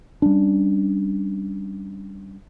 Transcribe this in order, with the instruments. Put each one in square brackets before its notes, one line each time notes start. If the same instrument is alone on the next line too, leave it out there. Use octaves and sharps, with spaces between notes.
[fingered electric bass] G3 C#4 D4